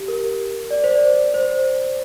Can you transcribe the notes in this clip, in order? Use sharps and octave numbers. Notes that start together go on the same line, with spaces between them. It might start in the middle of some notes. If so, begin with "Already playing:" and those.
Already playing: G4
A#4
D5
C5
D5
C5